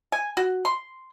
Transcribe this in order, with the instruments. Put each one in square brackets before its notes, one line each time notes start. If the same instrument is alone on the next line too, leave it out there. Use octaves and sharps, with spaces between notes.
[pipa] G#5
F#4
C6